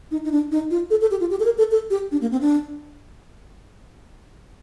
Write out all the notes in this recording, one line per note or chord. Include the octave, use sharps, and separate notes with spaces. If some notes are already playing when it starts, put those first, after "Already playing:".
D#4
D#4
D4
D#4
F4
A4
A4
G4
F4
G4
A4
A#4
A4
A4
G4
D4
A#3
C4
D4